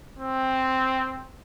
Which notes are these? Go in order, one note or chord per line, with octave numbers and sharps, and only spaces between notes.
C4